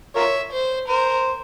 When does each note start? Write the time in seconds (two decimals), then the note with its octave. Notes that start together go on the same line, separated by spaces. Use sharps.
0.16 F4 A#4 C#5 E5
0.53 C5
0.88 A#4 C5